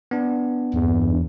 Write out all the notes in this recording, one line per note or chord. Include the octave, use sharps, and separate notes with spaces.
B3 D4
E2 G2